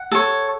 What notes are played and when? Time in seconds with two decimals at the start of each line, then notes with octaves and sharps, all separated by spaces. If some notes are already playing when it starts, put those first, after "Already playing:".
Already playing: F#5
0.12 A4 C#5